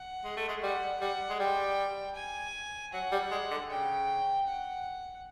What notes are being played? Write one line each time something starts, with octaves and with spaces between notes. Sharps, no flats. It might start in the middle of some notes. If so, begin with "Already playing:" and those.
Already playing: F#5
G#3
A3
G#3
G3 F#5
G3 F#5
G#3
G3 G5
G#5
F#3 F#5
G3
G#3
D3
C#3 G5
F#5